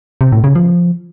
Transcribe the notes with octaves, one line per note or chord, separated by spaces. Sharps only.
C3
A2
C#3
F3